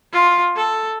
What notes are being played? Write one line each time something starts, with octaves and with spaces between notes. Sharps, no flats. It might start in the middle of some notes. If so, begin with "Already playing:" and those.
F4
A4